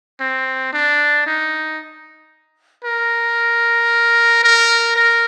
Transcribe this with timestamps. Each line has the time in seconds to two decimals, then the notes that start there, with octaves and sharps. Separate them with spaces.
0.20 C4
0.73 D4
1.26 D#4
2.85 A#4
4.43 A#4
4.96 A#4